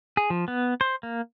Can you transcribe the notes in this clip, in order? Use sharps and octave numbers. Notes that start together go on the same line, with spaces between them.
G#4
F3
B3
C5
A#3